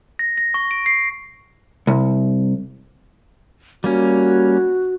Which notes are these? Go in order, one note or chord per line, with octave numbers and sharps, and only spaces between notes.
A#6
A#6
C#6
D7
C7
C2
G3 A#3 C#4 F#4